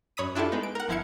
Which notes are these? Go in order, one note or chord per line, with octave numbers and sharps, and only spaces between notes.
F#2 C#5 B5 D#6 B6 D#7
D4 E4 F4 G4 A4
G#3 B3 D#4
D7
A#4 F#5
G1 F3 E4 F5 G#6 C#7